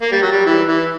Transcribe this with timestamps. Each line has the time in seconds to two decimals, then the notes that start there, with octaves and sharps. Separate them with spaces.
0.02 A#3
0.12 G3
0.22 F#3
0.32 G3
0.46 E3
0.68 E3